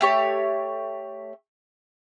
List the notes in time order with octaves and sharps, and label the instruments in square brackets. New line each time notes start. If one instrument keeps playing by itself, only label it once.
[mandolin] A3 G4 C#5